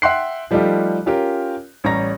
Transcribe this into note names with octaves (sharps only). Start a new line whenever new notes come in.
E5 F#5 G5 C6 F#6 C7
F3 G3 A3 D#4 F4 G4
C#4 F4 G4 A#4
A1 G3 C#5 A#5 A#6